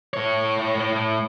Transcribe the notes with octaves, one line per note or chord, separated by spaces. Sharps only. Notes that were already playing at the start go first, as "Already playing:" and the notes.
A2 C#5